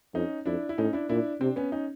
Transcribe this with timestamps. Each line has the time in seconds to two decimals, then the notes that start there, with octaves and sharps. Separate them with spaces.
0.14 F2 C#4 D#4
0.46 F2 D4 E4
0.69 E4
0.78 A2 C#4 D#4
0.93 D4 E4
1.09 A#2 D4 E4
1.41 C3 C4 D4
1.56 B3 C#4
1.72 C#4 D#4